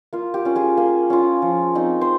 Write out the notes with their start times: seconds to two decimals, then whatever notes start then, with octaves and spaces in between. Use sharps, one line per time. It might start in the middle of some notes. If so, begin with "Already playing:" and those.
0.13 A#3 F4
0.34 G4
0.45 C#4 F4
0.56 F4 G#4
0.77 A#3
1.10 C#4 F4
1.42 F3
1.75 C4 D#4
2.01 C5